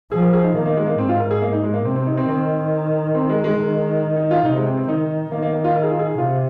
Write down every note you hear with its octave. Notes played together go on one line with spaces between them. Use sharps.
F3 G#4
A#4
G#4
D#4
D#3 A#3
A#3
G#3
A#3
G#2 C4
F4
A#4
G#4
A#3
D#4
G#3
A#3
C3 C4
C4
D#4
C4
D#3 C4
C4
G#3
G#3
D#3
D#4
F4
C3 D#4
G#3
C4
C4
D#3 D#4
D#3 A#3
A#3
A#3
F4
A#4
G#4
F4
G#4
C3 F4